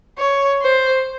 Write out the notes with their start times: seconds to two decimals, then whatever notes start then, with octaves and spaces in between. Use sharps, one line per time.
0.18 C#5
0.62 C5